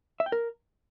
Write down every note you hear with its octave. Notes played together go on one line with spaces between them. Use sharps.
E5
G5
A#4